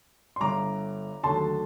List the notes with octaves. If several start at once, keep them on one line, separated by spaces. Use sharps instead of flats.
C6
G1 G2 D3 A#5 D6
D#2 D3 F#3 A3 A5 C6